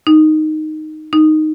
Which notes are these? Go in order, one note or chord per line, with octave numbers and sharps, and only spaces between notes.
D#4
D#4